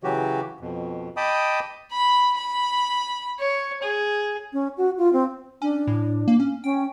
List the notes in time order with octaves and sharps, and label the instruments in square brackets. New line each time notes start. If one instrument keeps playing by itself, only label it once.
[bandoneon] C#3 E3 F#3 F#4 G4
F2 B2
D#5 G5 A5 B5 D6 D#6
[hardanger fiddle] B5
B5
C#5
G#4
[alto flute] C#4
F#4
F4
C4
[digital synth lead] C#4 [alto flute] D4
[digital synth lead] A2
A#3
C#4
[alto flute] C#4 [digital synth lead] G5